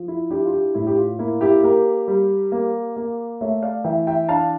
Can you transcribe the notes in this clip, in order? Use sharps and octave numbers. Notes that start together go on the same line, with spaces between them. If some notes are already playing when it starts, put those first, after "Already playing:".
Already playing: F3
E4
D4 E4 G4
F4
E4 G4
A2 E4
G4
F4
A#3 E4
E4 G4
A#3 G4 A#4
G3
A#3
A#3
A3 C#5 E5
D5 F5
E3 E5 G5
E5 G5
D4 F5 A5